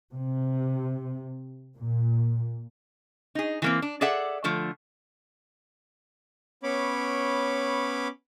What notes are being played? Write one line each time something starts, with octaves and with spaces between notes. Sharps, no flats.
C3
A#2
D#4 G#4
E3 A#3 C4
D4
G#4 A4 D5 E5 F#5
D3 F3 A3
B3 C#4 C#5 B5 D6